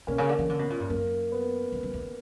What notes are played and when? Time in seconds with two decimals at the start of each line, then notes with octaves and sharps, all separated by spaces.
0.07 B2 A#3 C#4
0.18 C#3
0.29 D3
0.39 E3
0.49 D3
0.59 B2
0.70 A#2
0.80 G2
0.90 F#2 A#3
1.32 B3
1.72 F#2
1.83 F#2
1.94 E2